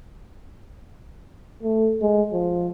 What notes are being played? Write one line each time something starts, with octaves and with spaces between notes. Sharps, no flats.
A3
G#3
F3